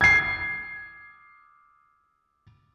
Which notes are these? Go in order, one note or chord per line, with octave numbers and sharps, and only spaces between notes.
G#6 C7